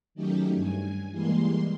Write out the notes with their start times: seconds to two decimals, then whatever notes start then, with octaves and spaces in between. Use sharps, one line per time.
0.15 D#3 F#3 A3 C#4 D#4 G4
0.55 G2 G#5
1.10 E3 G3 G#3 A#3 C6